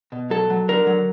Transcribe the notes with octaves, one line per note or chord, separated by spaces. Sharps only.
B2
F#3 A4
F#3
D3 A#4
F#3